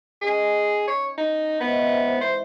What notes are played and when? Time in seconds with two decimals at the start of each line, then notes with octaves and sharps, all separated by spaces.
0.21 D#3 C#4 G#4
0.87 C#5
1.18 D#4
1.60 G#2 E3 B3 D#4
1.86 C3
2.21 C5 B5